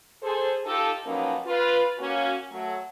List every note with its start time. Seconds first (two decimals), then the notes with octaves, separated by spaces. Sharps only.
0.23 G#4 A4 C5
0.66 D#4 F4 G4 A4
1.05 F3 F#3 A#3 B3 C#4 D#4
1.46 F4 B4
1.99 A#3 C#4 F#4
2.52 F#3 A3